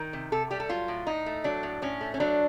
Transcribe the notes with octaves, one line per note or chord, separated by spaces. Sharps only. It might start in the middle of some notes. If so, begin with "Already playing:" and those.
Already playing: D#3 A#4
C3
C3 A4
G3 G4
A4
F#3 F4
A2
A2 D#4
A3
F#3 D4
A2
A2 C#4
A3
C#4
F#3 D4